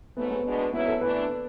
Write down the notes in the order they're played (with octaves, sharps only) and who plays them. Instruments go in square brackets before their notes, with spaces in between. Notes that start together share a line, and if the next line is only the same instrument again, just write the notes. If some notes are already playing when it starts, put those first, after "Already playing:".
[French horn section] G#2 F#3 A3 [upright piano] B3
[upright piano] B3
[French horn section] B2 G#3 D4
[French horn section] G#2 F#3 C#4 E4 [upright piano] B3
[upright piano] A4
[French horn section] E3 A3 D4 [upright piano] B4